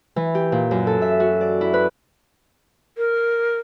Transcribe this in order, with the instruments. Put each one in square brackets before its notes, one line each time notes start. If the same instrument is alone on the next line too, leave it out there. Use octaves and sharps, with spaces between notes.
[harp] E3
G4
A#2
F#2
A4
E5
F#4
D5
E4
B4
[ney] A#4